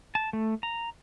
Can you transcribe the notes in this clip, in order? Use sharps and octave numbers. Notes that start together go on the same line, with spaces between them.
A5
A3
A#5